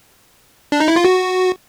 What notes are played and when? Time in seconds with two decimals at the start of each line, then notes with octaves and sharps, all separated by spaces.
0.72 D4
0.80 D#4
0.88 E4
0.96 F4
1.05 F#4